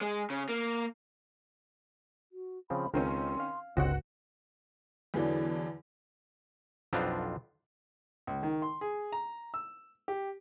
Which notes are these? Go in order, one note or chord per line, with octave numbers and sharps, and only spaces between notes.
G#3
C#3
A#3
F#4
C#3 F3 C4 B5
C#2 D#3 C4 C#4 A#4 C5 C6
F5
G1 C#2 C4 F#4 F#5
E2 D3 E3 F#3 D4
B1 F2 B3 C4 D4 F4
C#2
D#3
C6
G#4
A#5
E6
G4